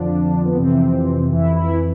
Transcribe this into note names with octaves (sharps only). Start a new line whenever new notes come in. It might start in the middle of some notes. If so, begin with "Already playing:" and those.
Already playing: F2 D3 F3 D4
B3
F2 C3 E3 C4
F2 E3 E4
E4